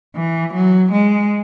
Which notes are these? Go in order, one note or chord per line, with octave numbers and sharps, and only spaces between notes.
E3
F#3
G#3